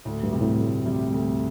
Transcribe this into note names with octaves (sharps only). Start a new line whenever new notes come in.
D2 A2
G2
C3 G3
A2
D2
C3 G3
D2